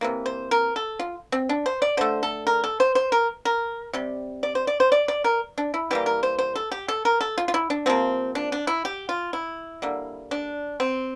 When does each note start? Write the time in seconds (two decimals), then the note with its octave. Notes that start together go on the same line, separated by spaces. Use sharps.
0.01 C3 E3 A#3
0.26 C5
0.51 A#4
0.76 A4
0.99 F4
1.32 C4
1.49 D4
1.66 C5
1.82 D5
1.97 D3 A3 C5
2.23 A4
2.47 A#4
2.64 A4
2.80 C5
2.95 C5
3.12 A#4
3.45 A#4
3.93 C3 G3
4.43 D5
4.55 C5
4.67 D5
4.80 C5
4.92 D5
5.08 D5
5.24 A#4
5.58 D4
5.74 E4
5.91 E3 G3 A#3 G4
6.06 A#4
6.23 C5
6.39 C5
6.55 A4
6.72 G4
6.88 A4
7.05 A#4
7.21 A4
7.38 F4
7.48 F4
7.54 E4
7.70 D4
7.86 C3 F3 A#3 C4
8.35 D4
8.52 D4
8.67 E4
8.85 G4
9.09 F4
9.33 E4
9.82 D3 G3 A#3
10.31 D4
10.80 C4